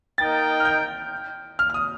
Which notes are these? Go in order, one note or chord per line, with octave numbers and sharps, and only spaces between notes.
A#3 D#4 A#4 D#5 G5 A6
F6
G6
F6
F6
D#6